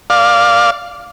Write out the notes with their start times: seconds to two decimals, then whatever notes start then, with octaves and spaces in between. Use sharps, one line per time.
0.10 D5 F5